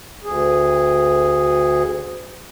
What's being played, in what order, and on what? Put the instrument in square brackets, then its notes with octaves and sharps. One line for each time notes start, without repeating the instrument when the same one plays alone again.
[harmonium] D2 G#4